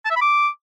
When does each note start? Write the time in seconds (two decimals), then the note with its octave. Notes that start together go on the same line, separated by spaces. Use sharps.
0.05 A5
0.11 E5
0.16 B5
0.22 D6